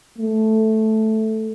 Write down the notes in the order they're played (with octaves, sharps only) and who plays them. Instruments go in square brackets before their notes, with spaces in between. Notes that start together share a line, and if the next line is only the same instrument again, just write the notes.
[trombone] A3